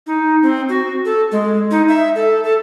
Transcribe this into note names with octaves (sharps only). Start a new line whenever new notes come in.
D#4
C4
F#4
A4
G#3
D#4
E5
A4
A4